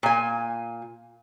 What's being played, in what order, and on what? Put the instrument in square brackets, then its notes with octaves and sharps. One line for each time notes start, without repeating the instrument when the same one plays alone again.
[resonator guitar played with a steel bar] A#2 G#5